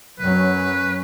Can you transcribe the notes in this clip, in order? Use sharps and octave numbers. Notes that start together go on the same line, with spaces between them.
F#2 F#3 C#4 B4